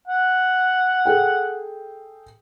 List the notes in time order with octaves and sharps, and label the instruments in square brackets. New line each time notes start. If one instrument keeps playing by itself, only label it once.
[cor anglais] F#5
[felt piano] G#4 A4 G5